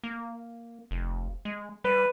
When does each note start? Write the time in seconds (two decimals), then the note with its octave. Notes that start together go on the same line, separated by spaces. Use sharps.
0.04 A#3
0.91 F1
1.45 G#3
1.84 G3 B4